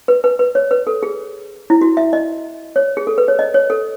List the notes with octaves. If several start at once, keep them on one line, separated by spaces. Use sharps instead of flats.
B4
B4
B4
C#5
B4
A4
G#4
E4
F#4
E5
D#5
C#5
G#4
A4
B4
C#5
D#5
C#5
A4